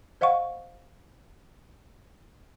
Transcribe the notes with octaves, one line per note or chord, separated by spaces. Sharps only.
C5 D#5 F5 F#5 C#6